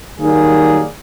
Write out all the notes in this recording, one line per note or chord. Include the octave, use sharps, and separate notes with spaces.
D#3 F#3 G3 A#3 G#4